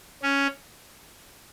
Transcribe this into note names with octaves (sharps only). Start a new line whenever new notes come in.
C#4